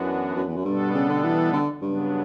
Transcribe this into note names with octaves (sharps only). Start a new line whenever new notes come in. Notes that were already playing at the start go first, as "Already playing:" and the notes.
Already playing: F#2 E3 B3 D4 F#4
F#2
E2
F#2
G2 B2 G3 B3 D4 A4
C#3
D3
E3
D3
G2 C#3 F#3 B3 D4